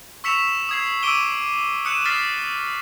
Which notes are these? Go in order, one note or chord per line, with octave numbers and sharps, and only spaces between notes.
C#6 E6 B6 C#7 E7 F7
D#6 G#6 C7
D6 E6 D7 D#7 G7
D#6 F#6 C#7 D#7 E7
D#6 F6 A6 B6 C7